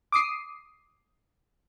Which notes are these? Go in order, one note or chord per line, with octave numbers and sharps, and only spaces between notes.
D6 D#6 C7